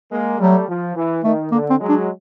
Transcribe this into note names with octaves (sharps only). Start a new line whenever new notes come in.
G#3 A#3
F#3 G3 A3
F3
E3
D#3 A3
D3 A#3
C4
F#3 G#3
D4